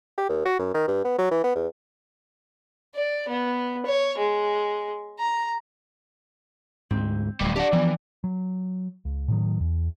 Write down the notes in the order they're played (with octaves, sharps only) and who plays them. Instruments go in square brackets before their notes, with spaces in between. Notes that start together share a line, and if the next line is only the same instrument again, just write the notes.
[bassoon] G4
D#2
F#4
F#2
D#3
G2
B3
F#3
E3
B3
E2
[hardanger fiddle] D5
B3
C#5
G#3
A#5
[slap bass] D2 G#2 [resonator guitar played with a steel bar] C4
[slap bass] D1 [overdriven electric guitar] A2 G3
[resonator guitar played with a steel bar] D4 [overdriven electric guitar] G4 F#5
[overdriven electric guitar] E3 [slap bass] F3 B3 [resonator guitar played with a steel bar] G5
[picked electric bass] F#3
C#2
A2 D#3 F#3
E2